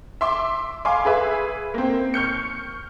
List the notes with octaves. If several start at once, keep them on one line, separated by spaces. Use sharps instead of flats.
E5 C6 D6
F5 G#5 B5 C6 D6
G#4 B4 E5
A#3 C4
C#6 F6 G6 C#7